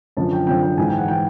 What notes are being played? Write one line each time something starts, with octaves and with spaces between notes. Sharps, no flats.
F#2 D3 F3 A5
G5
F#2 D3 F3 G5
G5
G#2 E3 G#5
G5
F#5
E3 G5